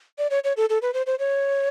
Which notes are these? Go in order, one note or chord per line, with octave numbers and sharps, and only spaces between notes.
D5
C#5
C#5
A4
A4
B4
C5
C5
C#5